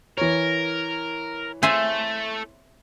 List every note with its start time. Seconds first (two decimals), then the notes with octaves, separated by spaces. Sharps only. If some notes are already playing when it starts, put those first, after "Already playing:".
0.18 E3 A#4 C#5
1.63 A3 C5 E5 G#5